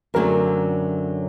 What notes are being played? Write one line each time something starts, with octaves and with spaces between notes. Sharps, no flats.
F#2 D3 F#3 A3 C4 A#4